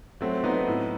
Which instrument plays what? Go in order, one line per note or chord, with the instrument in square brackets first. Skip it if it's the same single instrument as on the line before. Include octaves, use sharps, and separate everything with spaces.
[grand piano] F#3 A3 C4
F#3 B3 D#4
A2